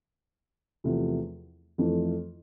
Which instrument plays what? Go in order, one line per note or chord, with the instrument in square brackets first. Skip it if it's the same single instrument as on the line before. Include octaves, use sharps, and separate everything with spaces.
[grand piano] E2 C3 F3 A3
F2 E3 A3 C4